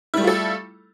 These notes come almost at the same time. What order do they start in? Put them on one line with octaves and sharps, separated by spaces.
E4 G3 A3 F4 A4